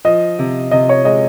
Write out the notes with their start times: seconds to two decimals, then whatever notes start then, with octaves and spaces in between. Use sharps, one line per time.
0.05 F3 D#5
0.39 C3
0.71 C3 D#5
0.89 C#5
1.05 G#3 D#5